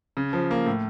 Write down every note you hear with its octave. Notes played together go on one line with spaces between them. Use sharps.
C#3
F3
A#3
A2